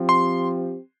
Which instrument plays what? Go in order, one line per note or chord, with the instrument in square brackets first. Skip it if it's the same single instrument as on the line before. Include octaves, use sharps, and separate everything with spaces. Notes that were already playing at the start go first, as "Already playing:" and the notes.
Already playing: [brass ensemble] F3 C4 G4
[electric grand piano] C6